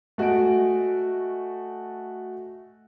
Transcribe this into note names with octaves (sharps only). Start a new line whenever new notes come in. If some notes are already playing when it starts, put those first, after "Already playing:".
A3 F#4 D#5 G#5 D7